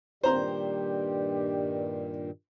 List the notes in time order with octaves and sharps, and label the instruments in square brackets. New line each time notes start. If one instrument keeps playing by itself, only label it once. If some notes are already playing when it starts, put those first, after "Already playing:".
[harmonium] G2 A#2 D#3 [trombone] G4 [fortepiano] C5 A#5 C6 [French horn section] D5